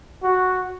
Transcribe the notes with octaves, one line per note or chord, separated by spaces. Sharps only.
F#4